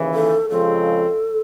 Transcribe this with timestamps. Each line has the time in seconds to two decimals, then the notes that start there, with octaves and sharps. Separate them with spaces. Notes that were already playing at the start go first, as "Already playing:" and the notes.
Already playing: D#2 C#3 E3
0.15 A4
0.49 F2 C#3 F3 G#3 C4 A4